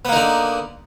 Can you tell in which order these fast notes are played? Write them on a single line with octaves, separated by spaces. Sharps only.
B3 A#3 D#4 D3